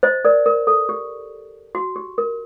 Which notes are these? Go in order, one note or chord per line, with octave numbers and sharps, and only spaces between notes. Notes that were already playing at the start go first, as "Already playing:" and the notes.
C5 D#5
A#4 D5
A#4
A4
G4
F#4
G4
A#4